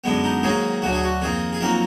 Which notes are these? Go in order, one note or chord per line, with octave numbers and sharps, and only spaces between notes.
F#2 D3 G#3 B3
D#4
G#2 D#3 F#3 A#3 G#4
D2 D3 F#3 F#4
G#4
F#4
F2 D#3 A#3 G#4
G#4
F2 D#3 F#3 A#3 A#4